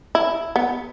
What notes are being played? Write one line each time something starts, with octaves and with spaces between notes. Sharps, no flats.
E4
B3